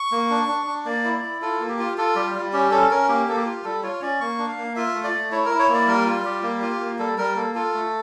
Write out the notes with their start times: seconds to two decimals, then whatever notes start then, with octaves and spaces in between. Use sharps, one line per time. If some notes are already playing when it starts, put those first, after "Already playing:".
Already playing: C#6
0.12 A#3
0.30 D4
0.48 D4
0.67 D4
0.85 A#3 D5
1.04 E4
1.13 D5
1.22 E4
1.42 F4 A4
1.60 A#3
1.69 G4
1.79 F4
1.98 F4 A4
2.16 G3 G4
2.35 G3
2.53 C#4 G4
2.71 C#4 A4
2.90 C#4 A#4
3.09 A#3 G4
3.28 A#3 A4
3.37 G4
3.46 F4
3.64 G3 A4
3.83 F4 C#5
4.02 C#4 D5
4.21 A#3 C#6
4.38 D4
4.48 F5
4.58 A#3
4.75 F4 E5
4.94 A3
5.04 D5
5.14 A3
5.31 E4 C#5
5.45 A#4
5.50 E4
5.59 C#5
5.69 A#3 D5
5.88 G3 A#4
6.06 F4
6.25 G3 G4
6.43 A#3
6.62 F4
6.80 A#3
6.99 G3 A4
7.18 G3 A#4
7.36 A#3 A4
7.55 F4 A4
7.74 A3